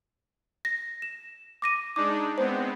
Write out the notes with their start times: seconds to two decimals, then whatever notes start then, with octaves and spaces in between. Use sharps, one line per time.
0.65 A#6
1.02 E7
1.62 D6 A#6 D#7
1.96 G#3 D4 D#4 D6
2.38 G#3 B3 C4 C5